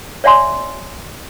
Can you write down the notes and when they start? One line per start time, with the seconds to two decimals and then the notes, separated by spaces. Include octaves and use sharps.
0.24 C#5 D5 E5 F#5 G#5 C6